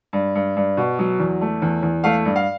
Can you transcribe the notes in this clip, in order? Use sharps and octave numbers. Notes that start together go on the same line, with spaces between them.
G2
G2
G2
B2
F#3
E2
A3
E2
E2
A3 F5
G2
F5